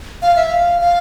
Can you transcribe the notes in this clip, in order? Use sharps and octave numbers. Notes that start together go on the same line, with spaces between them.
F5
E5
F5
F5